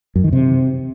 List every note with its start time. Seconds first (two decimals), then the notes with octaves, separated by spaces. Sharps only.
0.16 F#2
0.24 D#3
0.33 C3